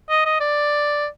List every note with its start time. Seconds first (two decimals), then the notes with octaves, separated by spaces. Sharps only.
0.10 D#5
0.25 D#5
0.40 D5